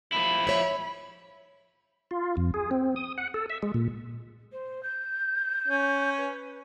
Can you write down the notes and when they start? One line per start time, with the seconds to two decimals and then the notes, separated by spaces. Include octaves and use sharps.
0.12 F3 E4 B5
0.47 C#5 E5
2.11 F4
2.37 F2
2.54 G#4
2.71 C4
2.96 D#6
3.18 F#5
3.34 A4
3.50 E5
3.62 G#3
3.74 A#2
4.52 C5
4.83 G6
5.68 C#4
6.17 B4